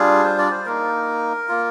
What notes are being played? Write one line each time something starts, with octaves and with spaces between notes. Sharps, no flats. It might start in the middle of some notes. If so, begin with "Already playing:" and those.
Already playing: G3 D4 F4 G#4
C5
D5
C5
A#3 D#4 A#4
A#3 F4